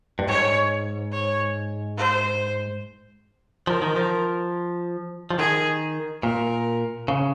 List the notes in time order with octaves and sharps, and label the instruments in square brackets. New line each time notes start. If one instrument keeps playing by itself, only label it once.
[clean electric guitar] G2
[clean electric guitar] G#2 [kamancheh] C#5
[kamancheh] C#5
C5
[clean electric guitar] F3 [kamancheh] A#4
[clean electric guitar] D#3
F3
F3
[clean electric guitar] D#3 [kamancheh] G#4
[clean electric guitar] A#2 [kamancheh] A#4
[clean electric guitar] C#3